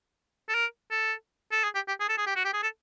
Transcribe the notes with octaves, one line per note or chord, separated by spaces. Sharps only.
A4
A#4
A4
A4
G#4
G4
G4
G#4
A4
G#4
G4
F#4
G4
G#4
A4